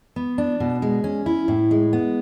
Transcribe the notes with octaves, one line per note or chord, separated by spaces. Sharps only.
B3
D4
B2
G#3
C#4
E4
A2
G#3
B3